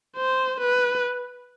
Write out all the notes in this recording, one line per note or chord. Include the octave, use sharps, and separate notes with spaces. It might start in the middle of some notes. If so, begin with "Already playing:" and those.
C5
B4